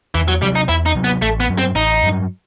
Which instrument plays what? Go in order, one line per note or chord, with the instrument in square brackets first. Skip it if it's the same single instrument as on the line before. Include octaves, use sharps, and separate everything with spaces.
[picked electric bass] E2 [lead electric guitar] E3
[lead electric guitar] F#3
[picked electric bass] C3 F#3 [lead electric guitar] G3
[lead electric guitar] D#4
[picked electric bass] E2 [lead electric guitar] E4
[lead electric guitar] D#4
[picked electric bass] C3 F#3
[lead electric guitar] B3
[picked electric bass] A1 [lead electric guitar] A3
[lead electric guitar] B3
[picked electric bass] G2 F#3
[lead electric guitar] C4
[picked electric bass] A1 [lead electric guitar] D#4
[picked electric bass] G2 F#3